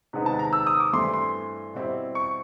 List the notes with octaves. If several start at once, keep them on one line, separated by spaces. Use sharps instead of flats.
C3 D#3 G#3 B3 D#4
A5
A#5
E6
D#6
D6
G2 E3 A3 C4 E4 C6
C6
B2 G3 C4 E4
C#6